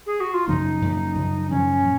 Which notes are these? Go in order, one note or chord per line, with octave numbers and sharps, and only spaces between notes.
G#4
F#4
F4
F#2 C#3 F3 A#3 D#4
F#2 C#3 F3 A#3
F#2 C#3 F3
F#2 C#3 F3 C#4
A#2